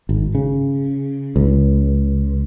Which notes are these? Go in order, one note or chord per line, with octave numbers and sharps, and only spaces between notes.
G#1
C#3
C#2